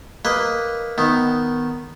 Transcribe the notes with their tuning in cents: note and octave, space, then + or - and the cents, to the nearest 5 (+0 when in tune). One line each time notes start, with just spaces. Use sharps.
A#3 +0 B4 +0 D#5 +0
D#3 +0 B3 +5 D#4 +0